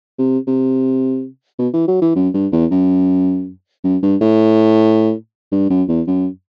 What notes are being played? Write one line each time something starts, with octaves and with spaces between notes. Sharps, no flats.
C3
C3
B2
E3
F#3
E3
F#2
G2
E2
F#2
F#2
G2
A2
G2
F#2
E2
F#2